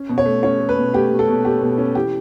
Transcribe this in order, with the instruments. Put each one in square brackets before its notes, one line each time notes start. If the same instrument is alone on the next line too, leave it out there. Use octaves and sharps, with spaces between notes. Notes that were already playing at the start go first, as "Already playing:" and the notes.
Already playing: [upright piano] C#4
B2
C#5
A3
C#4 C#5
A3
B4
B2
A3 G4
B2
A4
B2
A3 G4
B2
C#4
E3 G4